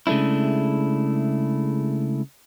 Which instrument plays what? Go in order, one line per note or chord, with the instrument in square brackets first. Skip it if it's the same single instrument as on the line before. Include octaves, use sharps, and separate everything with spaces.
[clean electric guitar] C#3 G#3 A3 D4 E4